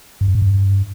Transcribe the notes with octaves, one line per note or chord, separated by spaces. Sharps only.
G2
F#2
G#2
G2